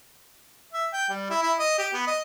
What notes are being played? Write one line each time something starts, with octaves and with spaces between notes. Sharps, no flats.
E5
G5
G3
E4
E4
D#5
G4
B3
D#5